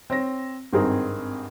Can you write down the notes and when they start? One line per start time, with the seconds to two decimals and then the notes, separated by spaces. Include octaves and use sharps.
0.10 C4 C#5 A#6
0.73 G#1 G2 C4 D#4 G#4 A#4